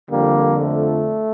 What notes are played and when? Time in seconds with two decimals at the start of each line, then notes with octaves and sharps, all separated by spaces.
0.10 F2 D3 F3 G3 A#3
0.61 A3